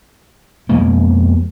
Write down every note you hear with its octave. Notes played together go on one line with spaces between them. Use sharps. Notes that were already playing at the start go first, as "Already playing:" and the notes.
F2 B2 G#3 A#3